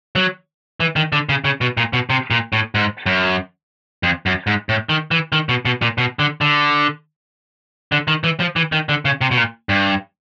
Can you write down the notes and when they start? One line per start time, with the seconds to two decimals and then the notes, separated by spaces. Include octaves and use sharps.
0.16 F#3
0.80 E3
0.96 D#3
1.12 D3
1.29 C#3
1.44 C#3
1.61 B2
1.77 A#2
1.93 B2
2.10 C3
2.31 A#2
2.53 A2
2.75 G#2
3.06 F#2
4.03 F2
4.26 F#2
4.47 G#2
4.69 A2
4.89 D#3
5.11 E3
5.32 D#3
5.49 B2
5.65 B2
5.82 A#2
5.98 B2
6.19 D3
6.41 D3
7.92 D3
8.08 D#3
8.24 E3
8.40 F3
8.56 E3
8.72 D#3
8.89 D3
9.05 C#3
9.21 C3
9.31 B2
9.37 A#2
9.69 G2